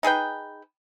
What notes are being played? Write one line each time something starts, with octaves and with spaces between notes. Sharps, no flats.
D#4 G#4 B4 G5